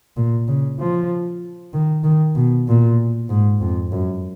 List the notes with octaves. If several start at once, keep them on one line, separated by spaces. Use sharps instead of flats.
A#2
C#3
F3
D#3
D#3
B2
A#2
G#2
F2
F#2